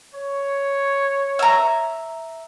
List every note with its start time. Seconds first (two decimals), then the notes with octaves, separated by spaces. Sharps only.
0.15 C#5
1.39 E5 A#5